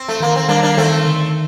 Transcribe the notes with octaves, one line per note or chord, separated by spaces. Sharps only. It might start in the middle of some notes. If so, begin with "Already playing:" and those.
Already playing: C4
A3
D#3 A#3
C4
G3 A#3 D4
A#3 D4
D#3 A3 C4
D3